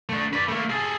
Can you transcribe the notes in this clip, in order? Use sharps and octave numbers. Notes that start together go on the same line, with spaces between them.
A3 D4
B4 D5
A3 A#3
G#4 A4